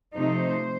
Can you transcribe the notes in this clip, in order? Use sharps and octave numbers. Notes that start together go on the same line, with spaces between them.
C3 F3 A3 D#4 C5